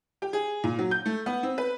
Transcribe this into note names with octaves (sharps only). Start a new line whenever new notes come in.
G4
G#4
A#2
F#3
G6
A3
B3
C4
B4